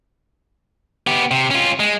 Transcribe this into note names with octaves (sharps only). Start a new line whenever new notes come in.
B3 G4
C3
C#4 F4
G#3